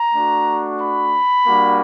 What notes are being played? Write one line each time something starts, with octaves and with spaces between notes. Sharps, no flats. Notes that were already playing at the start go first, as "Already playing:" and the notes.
Already playing: A#5
A3 D4 F#4
B5
G3 A#3 D4 F#4